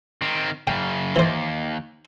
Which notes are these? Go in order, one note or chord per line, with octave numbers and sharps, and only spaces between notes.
D#3 C4
F#2 C#3 G5
D#2 E3 C5